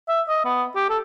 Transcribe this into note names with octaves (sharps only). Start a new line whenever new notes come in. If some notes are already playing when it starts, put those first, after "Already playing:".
E5
D#5
B3
G4
A4